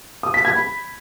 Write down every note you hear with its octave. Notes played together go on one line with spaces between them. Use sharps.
D#6
B6
G#6
B5